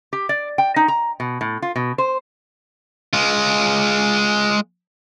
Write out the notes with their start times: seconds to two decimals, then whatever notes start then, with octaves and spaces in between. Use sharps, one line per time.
0.13 G4
0.29 D5
0.58 G5
0.76 D#4
0.88 A#5
1.20 B2
1.41 A2
1.62 F4
1.76 B2
1.98 C5
3.13 G#3 F4